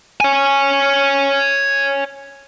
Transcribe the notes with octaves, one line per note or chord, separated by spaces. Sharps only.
C#5 G#5